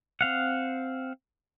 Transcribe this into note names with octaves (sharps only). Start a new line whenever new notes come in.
C4 F5 F#5